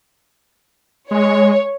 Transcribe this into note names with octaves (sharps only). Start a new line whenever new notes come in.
G#3 C#5